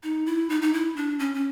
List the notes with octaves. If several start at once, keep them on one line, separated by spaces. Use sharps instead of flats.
D#4
E4
D#4
D#4
E4
D4
C#4
C#4